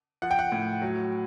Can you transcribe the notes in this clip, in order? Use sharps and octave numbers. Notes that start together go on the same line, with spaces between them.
F3 F#5
G5
F#5
A2
F#3